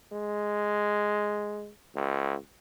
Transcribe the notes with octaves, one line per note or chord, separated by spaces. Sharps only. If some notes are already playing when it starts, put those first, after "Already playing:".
G#3
C#2